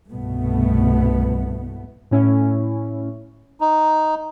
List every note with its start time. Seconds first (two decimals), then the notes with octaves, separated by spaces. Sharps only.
0.11 C2 G2 B2 A3 B3
2.11 A2 C#4 E4
3.61 D#4